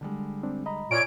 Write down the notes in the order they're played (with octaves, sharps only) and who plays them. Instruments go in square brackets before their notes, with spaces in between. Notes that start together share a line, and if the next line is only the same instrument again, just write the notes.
[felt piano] D3 G3 G#3
[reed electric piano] C4 D4
D#5 A#5 B5
[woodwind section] A#2 C#5 [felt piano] F4 G#5 C#6 [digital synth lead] D7